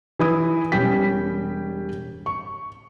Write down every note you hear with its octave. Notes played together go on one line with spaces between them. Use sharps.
E3 E4 D#6
E1 G3 C#4 G5 B6
C#6